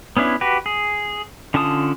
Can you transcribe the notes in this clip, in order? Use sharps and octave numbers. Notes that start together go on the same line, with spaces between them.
B3 C#4 D4 E4
F#4 G4 B4
G#4
D3 C#4 F4 A5 D#6